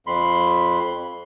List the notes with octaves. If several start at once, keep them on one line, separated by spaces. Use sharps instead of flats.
F2 B5 C6